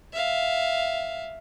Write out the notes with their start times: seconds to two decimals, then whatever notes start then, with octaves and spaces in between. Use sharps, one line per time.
0.13 E5 F5